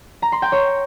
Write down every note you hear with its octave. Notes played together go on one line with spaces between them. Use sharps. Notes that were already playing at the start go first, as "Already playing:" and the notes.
A#5
C6
G5
C#5